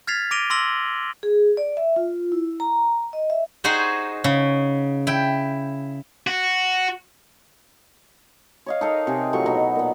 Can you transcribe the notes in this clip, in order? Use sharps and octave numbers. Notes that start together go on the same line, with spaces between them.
F6 G#6 A6 B6 C7 F7
D6 A#6 D7 D#7 F7 G7
C6 D6 E6 A#6 F#7 G7
G#4
D5
E5
F4
E4
A#5
D#5
E5
D#4 F#4 G#4 C5 D#5
C#3
E4 G5
F#4
C#5 D#5 F5
D#4 A4 A#4 F5
C3 G4 G#4
A2 F3 F#3 C#6
B2 D#4 A#5
A#2 B3